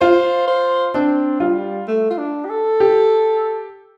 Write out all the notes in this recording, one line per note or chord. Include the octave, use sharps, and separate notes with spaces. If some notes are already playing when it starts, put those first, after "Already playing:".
F4 C5
C5
C4 D4
G3 F4
A3
F4
D4
G4
A4
G4